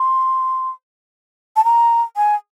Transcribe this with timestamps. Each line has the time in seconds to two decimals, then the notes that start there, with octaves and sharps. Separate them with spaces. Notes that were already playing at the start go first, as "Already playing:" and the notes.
Already playing: C6
1.56 A5
1.64 A#5
2.16 G#5